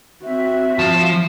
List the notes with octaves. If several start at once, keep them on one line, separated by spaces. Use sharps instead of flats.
C4 F#4 E5
F3 A5 E7